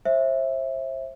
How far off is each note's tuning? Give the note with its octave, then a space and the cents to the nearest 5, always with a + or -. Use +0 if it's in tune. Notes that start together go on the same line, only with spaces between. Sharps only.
C5 +30 E5 +0